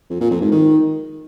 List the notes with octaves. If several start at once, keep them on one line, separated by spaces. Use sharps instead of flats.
F2
A#2
F2
G#2
D#3